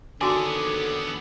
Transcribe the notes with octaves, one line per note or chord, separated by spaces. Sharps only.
D#2 D3 B3 F#4 G#4 A4 G#5 D6